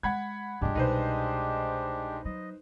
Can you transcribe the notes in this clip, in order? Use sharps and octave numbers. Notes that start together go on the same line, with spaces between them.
G#3 F#5 B5 G#6
G2 F3 G#3 D4 G4
C2 B2 D#4 B4 C5
F#3 D#5